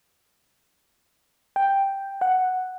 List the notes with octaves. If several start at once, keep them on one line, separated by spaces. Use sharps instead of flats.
G5
F#5